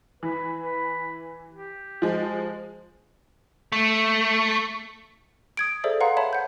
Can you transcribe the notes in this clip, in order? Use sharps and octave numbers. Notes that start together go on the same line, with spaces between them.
E3 B4
B4
G4
F3 G#3
A3
D#6 G#6 D7
G#4 A4 C5 D5 E5
B4 F5 F#5 A#5 C6
C#5 E5 A5 B5
F#5 G6